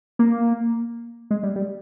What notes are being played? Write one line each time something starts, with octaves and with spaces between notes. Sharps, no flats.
A#3
G#3
G3
G3